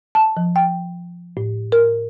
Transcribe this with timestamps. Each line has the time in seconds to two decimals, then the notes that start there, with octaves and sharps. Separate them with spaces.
0.15 A5
0.37 F3
0.56 G5
1.37 A2
1.72 A#4